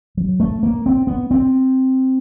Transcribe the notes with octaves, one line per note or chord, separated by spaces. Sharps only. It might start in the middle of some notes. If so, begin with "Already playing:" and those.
F#3
A3
A#3
C4
B3
C4